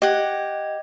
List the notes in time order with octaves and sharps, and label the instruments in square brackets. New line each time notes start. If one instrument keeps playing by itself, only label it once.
[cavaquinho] G4 F#5 [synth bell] D#5 G#6